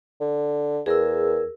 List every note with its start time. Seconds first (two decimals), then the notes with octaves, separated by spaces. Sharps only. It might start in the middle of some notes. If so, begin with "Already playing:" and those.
0.21 D3
0.86 E2 G#4 A#4 E6